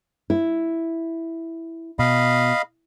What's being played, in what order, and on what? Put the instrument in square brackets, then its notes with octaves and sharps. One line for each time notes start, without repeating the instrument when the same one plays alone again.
[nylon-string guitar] E4
[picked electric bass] B2 [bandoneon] D#5 F5 B5